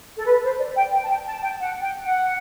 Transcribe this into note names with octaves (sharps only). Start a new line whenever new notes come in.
A4
B4
C5
D5
G5
G5
A5
G5
A5
G5
F#5
G5
F#5